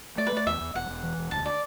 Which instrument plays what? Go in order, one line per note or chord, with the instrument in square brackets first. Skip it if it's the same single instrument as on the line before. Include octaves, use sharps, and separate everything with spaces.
[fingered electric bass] A3 [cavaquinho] D5
[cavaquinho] B4
[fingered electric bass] A3 [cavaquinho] D5
[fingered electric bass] E2 [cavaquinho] E5
[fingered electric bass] E2
[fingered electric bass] E1 [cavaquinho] F#5
[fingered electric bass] E1
E3
E1
[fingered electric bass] D2 [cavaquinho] A5
[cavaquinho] D5